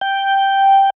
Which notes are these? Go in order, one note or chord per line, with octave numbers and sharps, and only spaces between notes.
G5